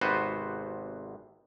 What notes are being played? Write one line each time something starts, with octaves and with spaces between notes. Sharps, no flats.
G#1 C3 B3 F#4 B4 C5